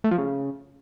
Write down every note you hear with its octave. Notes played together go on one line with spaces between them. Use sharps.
A3
F3
C#3